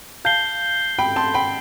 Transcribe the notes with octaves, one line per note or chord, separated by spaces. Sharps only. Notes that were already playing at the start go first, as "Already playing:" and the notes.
F5 A5 G6 C7 G7
G5 B5
A5 C6
G5 B5